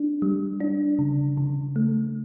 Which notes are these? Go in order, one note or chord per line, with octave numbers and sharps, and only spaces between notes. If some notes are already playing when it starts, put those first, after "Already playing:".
Already playing: D4
G3
D4
C#3
C#3
A3